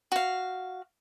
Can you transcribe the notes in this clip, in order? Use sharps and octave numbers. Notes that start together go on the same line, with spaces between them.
F#4 F5